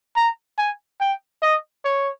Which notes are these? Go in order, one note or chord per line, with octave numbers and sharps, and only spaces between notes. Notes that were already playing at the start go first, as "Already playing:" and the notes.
A#5
G#5
G5
D#5
C#5